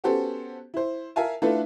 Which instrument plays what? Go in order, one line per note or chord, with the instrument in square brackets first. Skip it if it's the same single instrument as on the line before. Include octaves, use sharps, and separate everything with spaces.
[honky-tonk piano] B3 C#4 F#4 G4 A4 C5
E4 C5
A#4 E5 F5 G#5 A5
A3 D4 E4 F4 A4 B4